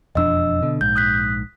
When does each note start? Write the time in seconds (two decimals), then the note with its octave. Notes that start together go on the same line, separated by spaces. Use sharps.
0.15 E1 F2 D4 D#5 E6
0.62 B2 D3
0.81 A#1 G#2 G6
0.96 D#6 F#6 B6